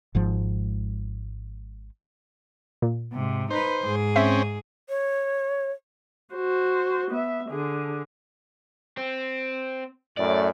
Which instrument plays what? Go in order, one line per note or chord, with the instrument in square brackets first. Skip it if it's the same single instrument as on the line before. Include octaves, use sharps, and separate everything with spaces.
[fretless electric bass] G#1 G#2 F3
[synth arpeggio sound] A#2
[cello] G#2 C3
[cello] D#4 B4 [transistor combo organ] C5
[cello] G#2 G#4
[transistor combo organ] C4 C#4 [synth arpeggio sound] E5 B6
[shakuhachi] C#5
[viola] F#4 C5
B3 E5
D3 G#4
[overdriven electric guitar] C4
[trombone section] F#2 A2 [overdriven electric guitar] D5